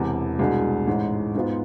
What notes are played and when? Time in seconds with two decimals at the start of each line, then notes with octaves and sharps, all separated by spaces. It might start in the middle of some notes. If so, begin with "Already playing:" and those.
Already playing: E1 E2 C3
0.39 C2 B2 G#3 D4 G#4
0.87 A1 G#2 G#3
1.35 G#2 G#3 B3 F4